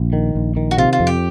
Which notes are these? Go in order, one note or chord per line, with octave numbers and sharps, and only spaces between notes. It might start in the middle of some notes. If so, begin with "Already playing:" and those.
Already playing: A#1
D#3
A#1
D#3
F#4
C3 F4
F4
F2
G4